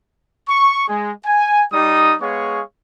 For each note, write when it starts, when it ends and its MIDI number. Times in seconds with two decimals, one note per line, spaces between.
0.49 0.88 85
0.88 1.11 56
1.25 1.63 80
1.72 2.15 55
1.72 2.15 63
1.72 2.15 87
2.21 2.62 56
2.21 2.62 59
2.21 2.62 68
2.21 2.62 73
2.21 2.62 77
2.21 2.62 85